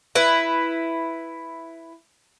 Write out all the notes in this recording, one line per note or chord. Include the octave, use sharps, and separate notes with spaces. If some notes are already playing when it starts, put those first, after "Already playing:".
E4 B4